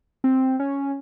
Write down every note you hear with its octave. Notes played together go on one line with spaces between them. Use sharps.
C4
C#4